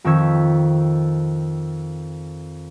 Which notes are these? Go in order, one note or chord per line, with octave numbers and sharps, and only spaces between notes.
F2 D#3 C#6 E6 G#6 B6